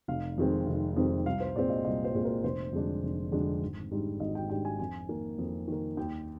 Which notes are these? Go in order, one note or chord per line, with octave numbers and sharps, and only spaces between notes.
F1 F5
F2 D#3 G#3 C4
F1
F2 D#3 G#3 C4
C2 F5
C5
A#2 G#3 C4 D5
D#5
C2 D#5
C5
A#2 G#3 C4
A#4
F1 C5
F2 D3 G#3 D4
F1
F2 D3 G#3 D4
G#1
G#2 G3 D4
G#1 D#5
G5
G#2 G3 D4 G5
G#5
F2 G#5
D#3 A#3
F2
D#3 A#3
D#2 G5